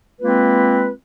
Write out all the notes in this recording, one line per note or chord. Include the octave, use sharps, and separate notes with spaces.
G#3 A#3 C4 F4 B4